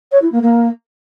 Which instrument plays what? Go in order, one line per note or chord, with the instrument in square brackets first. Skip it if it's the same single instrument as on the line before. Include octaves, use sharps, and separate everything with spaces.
[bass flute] C#5
E4
A#3
A#3